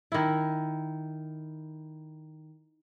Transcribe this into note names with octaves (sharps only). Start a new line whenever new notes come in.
D#3 E4